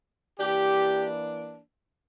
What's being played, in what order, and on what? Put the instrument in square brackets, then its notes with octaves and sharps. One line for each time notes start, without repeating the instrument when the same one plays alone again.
[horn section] E3 A#3 D4 G4